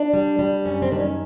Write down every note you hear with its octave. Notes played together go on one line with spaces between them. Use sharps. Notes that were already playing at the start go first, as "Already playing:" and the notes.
Already playing: D4
G3
G3
F#2 C#4
C4
D#3 D4
C#4